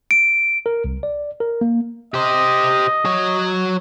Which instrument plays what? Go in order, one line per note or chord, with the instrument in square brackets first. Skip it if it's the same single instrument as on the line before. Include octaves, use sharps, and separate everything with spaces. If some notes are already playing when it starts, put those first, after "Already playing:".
[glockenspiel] D7
[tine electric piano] A#4
C2
D5
A#4
A#3
[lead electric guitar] G4 C5 [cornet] D#5
[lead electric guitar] F#3 C#5